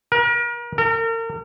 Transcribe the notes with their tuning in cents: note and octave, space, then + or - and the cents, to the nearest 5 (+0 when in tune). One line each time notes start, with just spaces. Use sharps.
A#4 +40
A#4 -35